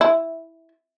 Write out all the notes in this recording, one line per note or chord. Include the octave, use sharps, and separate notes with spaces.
E4